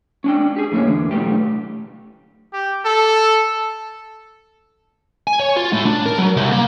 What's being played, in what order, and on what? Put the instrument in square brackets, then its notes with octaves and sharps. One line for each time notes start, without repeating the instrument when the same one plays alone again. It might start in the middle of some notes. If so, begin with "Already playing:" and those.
[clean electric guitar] C#4 D4 G5
G4 G#4
F2 A2 A#3 C#4
E2 D3
B1 A2 A3 G4
[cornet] G4
A4
[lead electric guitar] G#5
C#5
F4
A2
D4
A#4
F#3
C2
A#3